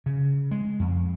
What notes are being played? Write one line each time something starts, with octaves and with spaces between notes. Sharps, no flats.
C#3
G#3
F2